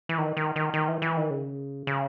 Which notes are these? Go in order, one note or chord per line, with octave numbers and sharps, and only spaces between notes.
E3
D#3
D#3
D#3
D#3
E3
E3
D#3
C#3
C#3